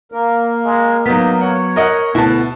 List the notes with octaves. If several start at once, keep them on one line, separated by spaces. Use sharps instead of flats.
A#3 A#4
G#3
F#3 B3 D#4 B6
C#5 F#5
A#4 D#5 F#5
D2 B2 B3 E4 B4 F#5 A5